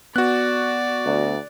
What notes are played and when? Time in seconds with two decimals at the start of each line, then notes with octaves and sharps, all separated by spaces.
0.16 B3 F#4 D5 F#6
1.06 D2